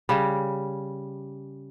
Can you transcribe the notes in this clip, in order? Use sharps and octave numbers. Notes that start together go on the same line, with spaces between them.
C#3 G3